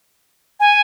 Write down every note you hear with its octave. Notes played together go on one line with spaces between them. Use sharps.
G#5